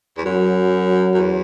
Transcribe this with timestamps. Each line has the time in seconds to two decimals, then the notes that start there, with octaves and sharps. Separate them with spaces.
0.17 E2
0.25 F#2 F#3
1.14 F#2
1.18 E2